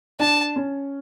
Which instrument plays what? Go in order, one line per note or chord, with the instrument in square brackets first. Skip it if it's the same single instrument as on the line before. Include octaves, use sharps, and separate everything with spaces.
[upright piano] D4 [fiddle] A5
[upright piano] C#4